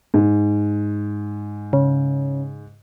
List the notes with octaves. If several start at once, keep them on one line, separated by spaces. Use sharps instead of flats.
G#2
C#3